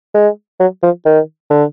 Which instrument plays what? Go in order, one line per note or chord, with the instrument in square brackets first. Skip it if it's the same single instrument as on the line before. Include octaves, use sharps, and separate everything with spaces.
[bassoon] G#3
F#3
F3
D#3
D3